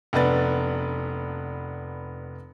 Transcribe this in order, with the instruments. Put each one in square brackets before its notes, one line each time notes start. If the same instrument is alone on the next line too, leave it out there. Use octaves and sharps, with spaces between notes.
[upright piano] F1 B3 D4 B4 A6